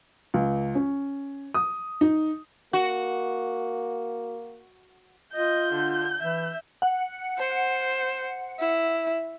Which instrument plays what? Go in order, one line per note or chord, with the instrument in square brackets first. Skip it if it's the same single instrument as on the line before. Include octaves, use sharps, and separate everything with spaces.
[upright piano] C#2
C#4
D#6
D#4
[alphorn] A#3 [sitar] F#4
[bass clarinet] F4 [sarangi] D#5 [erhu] G6
[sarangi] D3
[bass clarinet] E3 [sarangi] E5
[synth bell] F#5
[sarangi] C5
E4